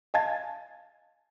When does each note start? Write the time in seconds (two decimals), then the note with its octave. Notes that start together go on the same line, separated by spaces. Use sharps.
0.14 D#5 F5 G#5 A5 G#6 A6